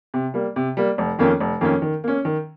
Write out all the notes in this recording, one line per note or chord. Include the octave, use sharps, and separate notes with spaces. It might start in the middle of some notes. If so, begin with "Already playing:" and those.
C3
G3 A#3
C3
G3 A#3
F1
F2 D#3 A#3 C#4
F1
F2 D#3 A#3 C#4
D#3
A#3 C#4
D#3